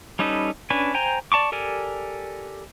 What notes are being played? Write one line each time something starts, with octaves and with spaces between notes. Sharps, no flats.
G3 C#4 D#4 A4 B4
C#4 D4 B4 G#5
C5 G5 G#5 A#5
D5 A5 C#6 D6
G4 A4 A#4 D5 G#5